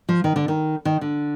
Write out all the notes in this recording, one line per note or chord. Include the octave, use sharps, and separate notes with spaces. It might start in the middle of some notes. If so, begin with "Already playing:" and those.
F3
D#3
D3
D#3
D#3
D3